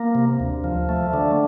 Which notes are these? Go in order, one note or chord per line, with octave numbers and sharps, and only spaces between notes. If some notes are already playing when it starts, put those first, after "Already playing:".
Already playing: A#3
C3
D2
F3
A3
D3